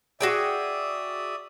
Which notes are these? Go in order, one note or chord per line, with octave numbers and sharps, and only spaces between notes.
F#4 G#4 D5 E5 G5 D#6